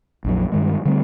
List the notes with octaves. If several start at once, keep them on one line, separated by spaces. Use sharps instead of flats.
A#1 F2 F#3
G2 D#3 G#3
D3 G3 A3 C4